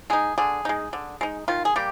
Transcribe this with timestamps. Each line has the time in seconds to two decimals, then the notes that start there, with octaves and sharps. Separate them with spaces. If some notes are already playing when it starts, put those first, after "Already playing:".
0.10 G#3 D#4 G#4
0.38 D3 G#4
0.65 G#3 D#4
0.93 D3
1.21 G#3 D#4
1.48 D#3 F4
1.65 G#4
1.76 G3 A#3 G4